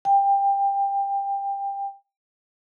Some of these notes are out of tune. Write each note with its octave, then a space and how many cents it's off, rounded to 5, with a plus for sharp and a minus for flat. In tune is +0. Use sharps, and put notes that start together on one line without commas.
G5 +20